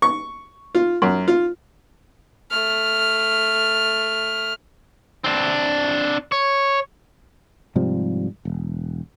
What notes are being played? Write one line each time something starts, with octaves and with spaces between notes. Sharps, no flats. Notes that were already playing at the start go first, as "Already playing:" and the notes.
C#6
F4
F#2
F4
A3 F6
C4 D4
C#5
G#2 C3 F3 G3
E1